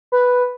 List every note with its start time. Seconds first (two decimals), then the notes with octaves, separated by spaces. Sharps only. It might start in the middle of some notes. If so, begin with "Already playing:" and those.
0.12 B4